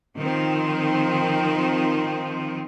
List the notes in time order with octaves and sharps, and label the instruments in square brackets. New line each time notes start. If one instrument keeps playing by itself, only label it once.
[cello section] D#3 F3 C4